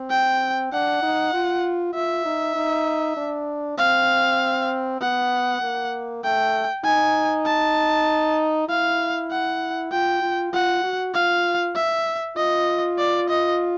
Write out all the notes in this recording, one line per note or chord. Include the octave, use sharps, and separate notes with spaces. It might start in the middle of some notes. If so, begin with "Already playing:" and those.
Already playing: C4
G5
D4 F#5
D#4
F4
F4 E5
D#4
D#4
D4
C4 F5
B3 F#5
A#3
A3 G5
D#4 G#5
A5
E4 F5
F#5
F4 G5
F4
F4 F#5
F#4
F4 F5
E5
F4 D#5
D5
D#5